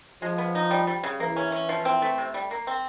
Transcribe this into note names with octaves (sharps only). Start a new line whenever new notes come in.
F3 G#3
B3
D#4
G3
G3
C#3
E3 A#3
C#4
C#4
F3
C4
A3
C3
G3
A#3
C4